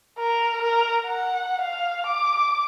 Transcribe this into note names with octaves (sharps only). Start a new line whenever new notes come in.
A#4
A#4
F#5
F5
D6